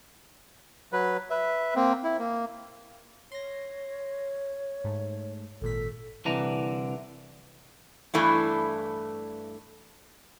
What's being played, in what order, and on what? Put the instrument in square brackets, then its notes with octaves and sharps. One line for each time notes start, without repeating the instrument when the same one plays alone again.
[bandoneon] F#3 B4
B4 E5
A#3 C4
E4
A#3
[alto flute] C#5 [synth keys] C6 A#6
[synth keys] G#2 A3
[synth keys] G#1 A#2 B6 [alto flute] A4
[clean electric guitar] C2 D3 E3 A#5
[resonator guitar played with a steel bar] G2 E3 A3 D4 E4